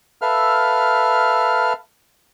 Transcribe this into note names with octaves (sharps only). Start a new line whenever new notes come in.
A4 B4 E5 F5 F6